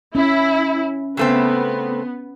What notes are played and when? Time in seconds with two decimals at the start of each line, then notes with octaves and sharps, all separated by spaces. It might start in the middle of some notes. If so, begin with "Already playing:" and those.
0.15 C#4 E4
1.17 C#3 A3 B3 C4